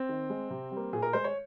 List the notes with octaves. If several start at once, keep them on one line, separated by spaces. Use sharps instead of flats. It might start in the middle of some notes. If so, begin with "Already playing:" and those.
Already playing: C4
D#3
G#3
C3
G3
A#3
A#2 G#4
A#4
G#3 C5
C#5